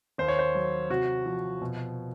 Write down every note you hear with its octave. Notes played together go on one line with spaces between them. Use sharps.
D#2 C5
C#5
C5
F#3
C3 F#4
F3
B2